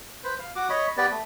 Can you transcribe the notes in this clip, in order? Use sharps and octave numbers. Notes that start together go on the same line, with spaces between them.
B4 C5
F5
F#4 D6
C#5 D#5 B5
B3 G4 B4 D5
A3